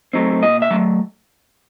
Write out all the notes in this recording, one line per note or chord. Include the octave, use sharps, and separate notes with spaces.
F#3 A3 C4 D#4
A#2 D#5
E5
F#3 A3